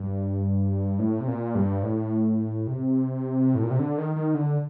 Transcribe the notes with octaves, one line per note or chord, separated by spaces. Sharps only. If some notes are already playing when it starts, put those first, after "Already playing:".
Already playing: G2
A2
C3
A#2
G2
A2
C3
A2
A#2
C3
D3
D#3
D#3
D3